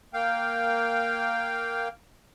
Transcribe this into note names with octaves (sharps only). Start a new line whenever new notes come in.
A#3 F5 G5